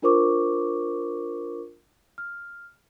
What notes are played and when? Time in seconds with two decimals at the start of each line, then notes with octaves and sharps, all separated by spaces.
0.02 D4 F4 A#4 C5 C#6 D6
2.18 F6